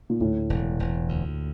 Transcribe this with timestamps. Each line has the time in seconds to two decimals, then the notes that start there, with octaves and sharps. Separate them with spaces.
0.09 A#2
0.20 D2 A2
0.50 E1
0.79 E1
1.09 D2